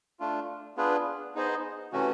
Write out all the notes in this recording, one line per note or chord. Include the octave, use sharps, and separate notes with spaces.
A3 D4 F4
B3 D4 F4 G#4 B4
B3 D#4 G#4 C5 D#5
C3 E3 A3 C#4 F#4